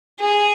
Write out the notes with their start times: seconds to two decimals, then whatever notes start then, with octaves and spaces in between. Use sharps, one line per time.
0.20 G#4